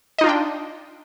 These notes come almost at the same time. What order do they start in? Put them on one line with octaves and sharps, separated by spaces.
D#5 D#4 F4 D4 G5